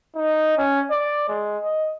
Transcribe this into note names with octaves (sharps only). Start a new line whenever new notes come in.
D#4
C#4
D5
G#3
D#5